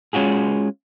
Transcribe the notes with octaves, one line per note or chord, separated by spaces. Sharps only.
G#3 C#4 F4 F#4 G#4